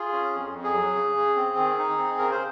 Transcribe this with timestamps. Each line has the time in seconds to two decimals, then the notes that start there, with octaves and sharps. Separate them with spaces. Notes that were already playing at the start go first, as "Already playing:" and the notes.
Already playing: F4 G#4
0.13 C#4
0.33 F2
0.54 F2
0.64 G#4
0.74 F#3
0.95 C#3
1.16 C#3
1.36 C4
1.57 D#3
1.78 D#4
1.98 C4
2.19 C#3 A#4
2.31 C5